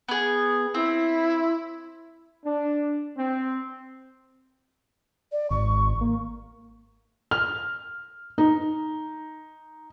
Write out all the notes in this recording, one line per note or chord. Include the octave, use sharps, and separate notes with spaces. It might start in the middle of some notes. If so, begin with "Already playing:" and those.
B3 G#4
C4 E4
D4
C4
D5
G#1 C#6
A#3
F6
D#4